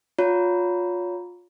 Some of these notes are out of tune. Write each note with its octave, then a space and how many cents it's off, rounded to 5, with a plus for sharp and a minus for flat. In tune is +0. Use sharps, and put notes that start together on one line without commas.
F4 +25 C#5 +25 A#5 +0